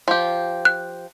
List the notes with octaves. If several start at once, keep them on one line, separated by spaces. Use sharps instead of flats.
F3 G4
F#6